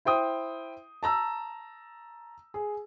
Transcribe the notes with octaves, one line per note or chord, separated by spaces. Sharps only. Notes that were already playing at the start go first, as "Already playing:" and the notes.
E4 C5 G5 D#6
A5 A#5 E6
G#4